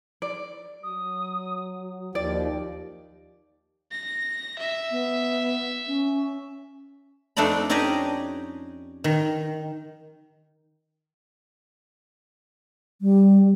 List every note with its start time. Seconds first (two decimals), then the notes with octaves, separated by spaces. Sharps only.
0.22 D5
0.83 F#3 D#6
2.15 D#2 F3 D5 G5
3.92 A#6
4.59 E5
4.91 B3
5.87 C#4
7.37 F2 A3 D4 D#4 D5 B5
7.69 C#4 D#4 G4 G#4 D5 D#5
9.04 D#3
13.02 G3